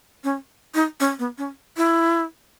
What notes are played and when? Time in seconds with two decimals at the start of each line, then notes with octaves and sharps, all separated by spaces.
0.24 C#4
0.74 D#4
1.00 C#4
1.19 B3
1.38 C#4
1.77 E4